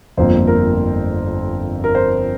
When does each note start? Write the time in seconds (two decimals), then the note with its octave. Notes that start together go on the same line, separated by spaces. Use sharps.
0.17 G1 F2 F3 A#3 C5
0.47 A#4
1.84 A#4
1.95 C5